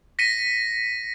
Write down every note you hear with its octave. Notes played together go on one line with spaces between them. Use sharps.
A#6 B6 C#7 D#7